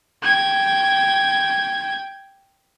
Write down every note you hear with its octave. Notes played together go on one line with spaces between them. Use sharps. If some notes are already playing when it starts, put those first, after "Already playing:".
G5 G#6